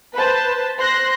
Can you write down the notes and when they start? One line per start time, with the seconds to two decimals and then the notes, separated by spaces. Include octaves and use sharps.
0.15 B4 C5 A5
0.78 C5 C6 F#6 A#6